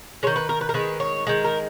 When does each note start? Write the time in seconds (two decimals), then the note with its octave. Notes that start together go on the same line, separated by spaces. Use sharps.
0.23 D#3 G#3 C#5
0.36 B4
0.49 A#4
0.61 B4
0.69 A#4
0.74 D#3 G#3 B4
1.00 C#5
1.27 D#3 G#3
1.44 A#4